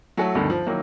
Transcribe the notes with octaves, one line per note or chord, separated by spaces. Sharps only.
F#3 A3 E4 F#4 A4
D2 G2 B2 D3 D#3
F3
D#3 F#3 A#3 E4